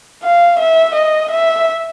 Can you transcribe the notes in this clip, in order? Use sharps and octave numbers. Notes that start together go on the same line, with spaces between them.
F5
E5
D#5
E5